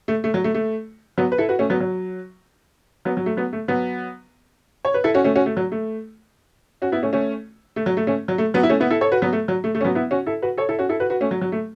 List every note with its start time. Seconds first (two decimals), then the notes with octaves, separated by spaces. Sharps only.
0.08 A3
0.24 A3
0.34 F#3
0.44 A3
0.54 A3
1.18 F#3 B3
1.32 B4
1.38 E4 A4
1.49 F#4 B4
1.59 A3 C#4
1.70 F#3 B3
1.80 F#3
3.05 F#3 B3
3.17 F#3
3.26 A3
3.37 F#3 B3
3.53 A3
3.68 F#3 B3
4.85 C#5
4.94 B4
5.04 E4 A4
5.14 C#4 F#4
5.24 A3 C#4
5.35 C#4 F#4
5.46 A3
5.57 F#3
5.72 A3
6.82 C#4 F#4
6.92 B3 E4
7.03 A3 C#4
7.13 A3 C#4
7.76 A3
7.86 F#3
7.97 A3
8.07 A3 C#4
8.28 F#3
8.38 A3
8.54 F#3 B3
8.63 E4
8.69 A3 C#4
8.80 B3 E4
8.90 E4 A4
9.01 A4 C#5
9.12 F#4 B4
9.22 F#3 B3
9.33 A3
9.48 F#3
9.64 A3
9.75 A3
9.81 C#4
9.85 F#3 B3
9.95 B3 E4
10.11 C#4 F#4
10.26 E4 A4
10.42 F#4 B4
10.58 A4 C#5
10.69 E4 A4
10.79 C#4 F#4
10.89 E4 A4
11.00 F#4 B4
11.10 F#4 B4
11.21 A3 C#4
11.31 F#3
11.41 F#3
11.52 A3